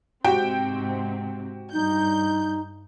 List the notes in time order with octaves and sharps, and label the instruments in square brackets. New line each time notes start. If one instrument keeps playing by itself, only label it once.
[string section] G#2 C3 C4 [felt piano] F#4 G4 G5
[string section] G2 G6 [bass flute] D#4